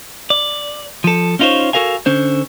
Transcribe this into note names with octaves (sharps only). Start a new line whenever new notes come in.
D5
F3 A4
C#4 D#4 F4 A4 C5 C#5
F#4 A4 A#4 F5 G#5
D3 C#4 C5